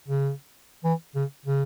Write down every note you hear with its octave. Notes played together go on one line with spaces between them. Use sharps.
C#3
E3
C#3
C#3